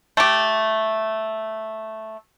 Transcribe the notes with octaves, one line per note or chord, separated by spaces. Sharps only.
A3 G4